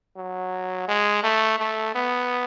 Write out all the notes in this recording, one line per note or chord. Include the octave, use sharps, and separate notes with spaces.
F#3
G#3
A3
A3
B3